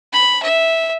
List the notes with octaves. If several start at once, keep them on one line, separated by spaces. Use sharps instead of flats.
B5
E5